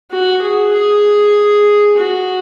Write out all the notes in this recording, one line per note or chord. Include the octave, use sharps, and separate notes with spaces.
F#4
G#4
G#4
F#4